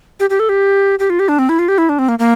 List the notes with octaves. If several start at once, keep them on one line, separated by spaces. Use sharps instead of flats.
G4
G4
A4
G4
G4
F4
G4
D4
C4
E4
F4
G4
E4
D4
C4
A#3
A#3